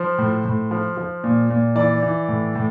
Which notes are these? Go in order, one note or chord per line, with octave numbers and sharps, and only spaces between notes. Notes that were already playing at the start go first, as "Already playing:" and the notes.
Already playing: F3 C5
A2
A2
F3
F3
A#2
A#2
E3 D5
E3
A2
A2